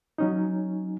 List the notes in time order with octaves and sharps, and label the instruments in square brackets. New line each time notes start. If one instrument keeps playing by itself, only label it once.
[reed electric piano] F#3 C#4 D#4